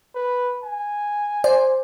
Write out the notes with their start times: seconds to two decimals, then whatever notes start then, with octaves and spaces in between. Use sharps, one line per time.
0.15 B4
0.63 G#5
1.44 C5 D5